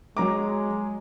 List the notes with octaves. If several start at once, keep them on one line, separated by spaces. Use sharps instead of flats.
F#3 G#3 A#5 D6